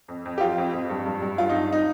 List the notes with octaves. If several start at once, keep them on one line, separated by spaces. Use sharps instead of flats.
F2
F2
G4
F3 F4
F2
F2
G2
G2
G2
G2 F4
G2 D#4
D#4